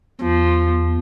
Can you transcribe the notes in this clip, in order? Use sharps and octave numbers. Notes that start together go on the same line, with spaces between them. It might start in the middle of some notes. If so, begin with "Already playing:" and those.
E2 F3